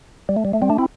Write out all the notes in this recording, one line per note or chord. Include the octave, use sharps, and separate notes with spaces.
G3
A3
G3
A3
G3 C4
A3 D4
C4 E4